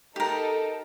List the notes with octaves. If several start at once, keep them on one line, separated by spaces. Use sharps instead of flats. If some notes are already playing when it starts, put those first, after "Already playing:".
D#4 G4 A4 A#4